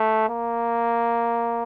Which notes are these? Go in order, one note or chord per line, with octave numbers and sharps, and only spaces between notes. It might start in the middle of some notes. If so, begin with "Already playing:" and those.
Already playing: A3
A#3